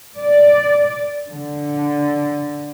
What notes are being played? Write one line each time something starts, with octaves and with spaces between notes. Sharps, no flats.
D5
D3